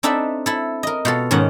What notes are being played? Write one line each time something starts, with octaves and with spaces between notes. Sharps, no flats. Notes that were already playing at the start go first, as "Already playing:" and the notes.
C4 D4 D#4 A4 E5 B5
E4 A4
A#4 D#5
B2 F4 A4
G#2 D#3 C#4 F#5